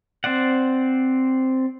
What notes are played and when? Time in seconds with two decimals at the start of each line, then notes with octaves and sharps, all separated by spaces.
0.24 C4 C5 D5 F#5